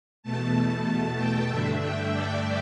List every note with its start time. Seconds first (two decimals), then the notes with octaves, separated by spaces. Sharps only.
0.23 E2 B2 A3 A5
0.85 A5
1.17 G5
1.49 G2 D3 A3 D4 E5
1.81 G5
2.13 D5